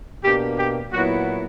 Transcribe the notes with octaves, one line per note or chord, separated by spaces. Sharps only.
B2 A#3 D4 G4
G4
A#2 F#3 B3 E4 F#4